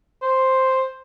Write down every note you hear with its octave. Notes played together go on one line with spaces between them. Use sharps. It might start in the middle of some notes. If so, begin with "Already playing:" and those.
C5